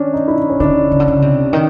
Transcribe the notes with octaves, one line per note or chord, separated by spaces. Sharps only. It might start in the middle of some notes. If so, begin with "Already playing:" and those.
Already playing: D#3 C#4 D4
D#4
E4
D#4
C#4
D3 D4
C#3
D3
C#3
C3
D#3